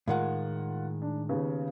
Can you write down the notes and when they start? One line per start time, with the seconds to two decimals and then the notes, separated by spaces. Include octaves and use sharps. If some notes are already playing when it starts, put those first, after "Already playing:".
0.08 A2 D#3 G#3 F4 A#4 F#5
1.02 D4
1.29 D#2 C#3 B3